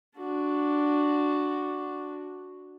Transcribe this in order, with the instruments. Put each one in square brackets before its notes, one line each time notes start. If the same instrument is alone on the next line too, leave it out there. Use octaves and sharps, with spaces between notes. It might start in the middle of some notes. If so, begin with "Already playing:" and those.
[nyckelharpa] D4 F#4